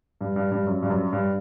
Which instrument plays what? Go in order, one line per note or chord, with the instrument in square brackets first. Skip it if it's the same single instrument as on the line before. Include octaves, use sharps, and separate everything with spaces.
[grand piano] G2
G2
G2
F#2
G2
F#2
G2